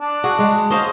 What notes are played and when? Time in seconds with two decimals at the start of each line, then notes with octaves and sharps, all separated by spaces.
0.01 D4
0.24 F#4 G#4
0.39 G#3
0.70 C#4 C5 D#5 F5